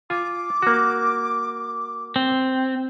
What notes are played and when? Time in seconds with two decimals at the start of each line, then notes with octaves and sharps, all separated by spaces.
0.10 F4 G#5 D6
0.62 A#3 F#4
2.16 C4